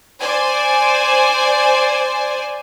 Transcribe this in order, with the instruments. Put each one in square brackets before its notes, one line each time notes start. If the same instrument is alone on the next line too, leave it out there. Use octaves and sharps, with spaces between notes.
[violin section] C5 D5 G#5